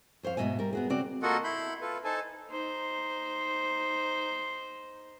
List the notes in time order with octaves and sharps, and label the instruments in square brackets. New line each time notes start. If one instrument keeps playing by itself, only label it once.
[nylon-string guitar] F2 C5 C#5 F5
G#2 B2 G#3 D#5 E5 G#5
G3 A#4
B3 F#4 G#4
C#3 C4 F#4 D5
[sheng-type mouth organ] A#3 F4 F#4 A4 D#5 F#5
E4 B5 C6 G6
F4 A4 B4
D#4 A4 C5 G#5 A5
[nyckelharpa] D#4 C5